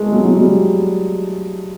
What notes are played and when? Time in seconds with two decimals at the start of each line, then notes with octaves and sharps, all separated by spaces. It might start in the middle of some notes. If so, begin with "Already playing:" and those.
Already playing: G#3 A3
0.12 F#3
0.25 G#3
0.37 G3